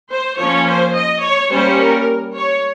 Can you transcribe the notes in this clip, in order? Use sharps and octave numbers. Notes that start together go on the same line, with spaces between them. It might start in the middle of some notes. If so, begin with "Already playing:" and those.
C5
F3 A#3 C#4 C#5
C5
D#5
C#5
G3 A#3 C#4 C5
A#4
C#5